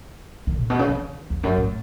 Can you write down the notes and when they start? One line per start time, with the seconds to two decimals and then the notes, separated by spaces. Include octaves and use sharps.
0.47 D#3
0.60 A2
0.70 B2
0.79 C#3
0.89 D#3
1.30 E2
1.43 F#2
1.58 A2